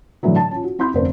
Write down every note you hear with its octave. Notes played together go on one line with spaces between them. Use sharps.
A2 D3 E3 F#3
A5
C#4 F4
F#4
C4 E4 B5 C6 G6
F1 D3 B4 C5